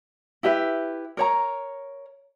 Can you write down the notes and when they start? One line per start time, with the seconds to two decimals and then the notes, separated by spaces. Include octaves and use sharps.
0.43 E4 G4 B4 E5
1.17 A#4 C#5 A#5